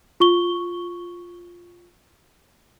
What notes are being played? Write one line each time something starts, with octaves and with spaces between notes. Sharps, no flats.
F4 C#6 G7